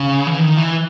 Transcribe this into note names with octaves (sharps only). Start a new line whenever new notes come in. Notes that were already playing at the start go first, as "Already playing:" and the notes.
Already playing: C#3
E3
D#3
E3